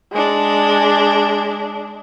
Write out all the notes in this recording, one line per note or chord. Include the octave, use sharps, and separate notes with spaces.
G#3 D4